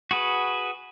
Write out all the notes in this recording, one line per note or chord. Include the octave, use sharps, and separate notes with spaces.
F#4 G#4 B4